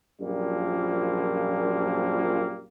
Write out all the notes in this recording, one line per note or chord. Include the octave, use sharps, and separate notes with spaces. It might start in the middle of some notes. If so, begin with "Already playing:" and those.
A#1 F#2 A#2 F3 G3 A#3